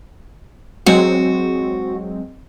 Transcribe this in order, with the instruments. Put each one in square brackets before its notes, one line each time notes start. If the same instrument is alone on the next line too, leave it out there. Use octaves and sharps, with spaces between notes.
[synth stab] F#3 G#3 C4 [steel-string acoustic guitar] F#4